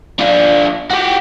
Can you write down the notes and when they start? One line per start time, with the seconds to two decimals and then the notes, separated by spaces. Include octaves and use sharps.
0.19 D4 F4
0.91 F#4 G4